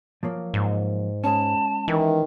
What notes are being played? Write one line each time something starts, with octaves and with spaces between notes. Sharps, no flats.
F3 F#3 A#3
G#2
G#3 C#4 A5
D#3 E3